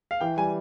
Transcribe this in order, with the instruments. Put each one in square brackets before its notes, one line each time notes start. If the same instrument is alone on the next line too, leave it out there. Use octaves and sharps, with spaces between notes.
[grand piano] F5
[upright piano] E3 [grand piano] G5
[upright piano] G3 [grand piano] G#5